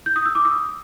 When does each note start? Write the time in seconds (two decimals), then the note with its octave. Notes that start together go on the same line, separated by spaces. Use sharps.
0.06 G6
0.16 D#6
0.26 E6
0.35 D6
0.45 D#6